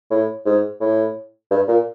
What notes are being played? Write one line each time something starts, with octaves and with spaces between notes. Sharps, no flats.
A2
G#2
A2
G2
A#2